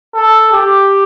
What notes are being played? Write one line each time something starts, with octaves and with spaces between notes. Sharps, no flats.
A4
G4